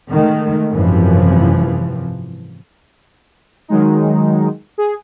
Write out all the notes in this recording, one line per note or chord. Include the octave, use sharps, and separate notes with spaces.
D#3 G#3 A3
G#1 F#2 C3 E3 F3
D#3 F#3 G#3 D#4
G#4